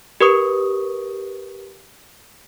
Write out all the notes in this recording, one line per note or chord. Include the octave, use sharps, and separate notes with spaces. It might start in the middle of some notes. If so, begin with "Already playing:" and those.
G4 A#4 B4 C#6 D#6